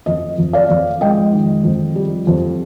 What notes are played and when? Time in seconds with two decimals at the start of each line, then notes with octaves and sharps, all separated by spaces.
0.06 F2 D#5
0.38 F2
0.53 D5 F5
0.69 F2
1.01 G#3 D#5 G5
1.33 D#3
1.64 F2
1.96 G3
2.27 F2